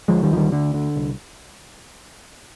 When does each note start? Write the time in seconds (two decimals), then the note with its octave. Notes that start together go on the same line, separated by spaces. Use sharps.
0.08 D2 F3 G#3
0.23 D#3 G3
0.30 D2 F3
0.37 D#3 G3
0.52 D2 D3
0.74 D3
0.96 C2